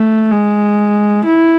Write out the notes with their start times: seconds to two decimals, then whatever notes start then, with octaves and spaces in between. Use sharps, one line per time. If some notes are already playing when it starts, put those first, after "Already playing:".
Already playing: A3
0.31 G#3
1.25 E4